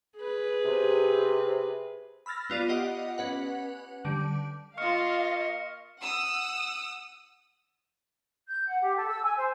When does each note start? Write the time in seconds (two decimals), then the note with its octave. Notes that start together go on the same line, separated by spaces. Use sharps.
0.17 G#4 B4
0.64 C3
2.26 B5 E6 F6 A6 A#6
2.50 B3 F4 D5 D#7
2.69 G4 D#5 F#5
3.18 C#4 B4 F#5
4.05 D3 G3 D7
4.77 A#3 F4 D#5 F5 C#6 F6 C#7
6.01 F#5 D#6 E6
8.48 G6
8.66 F#5
8.82 G4
8.97 A4
9.09 E6
9.22 G#5
9.37 C5